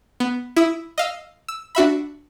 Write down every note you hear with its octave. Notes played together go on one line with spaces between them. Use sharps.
B3
E4 D#6 E6
D#5 F5 E6
E6
D4 F#4 E5 B5